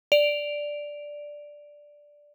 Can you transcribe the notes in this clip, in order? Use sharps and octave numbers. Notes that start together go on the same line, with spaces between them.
D5 D7 F7